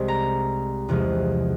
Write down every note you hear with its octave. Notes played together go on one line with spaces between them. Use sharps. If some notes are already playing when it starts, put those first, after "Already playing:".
Already playing: C2 G#3
A#5
E2 C3 F3 G#3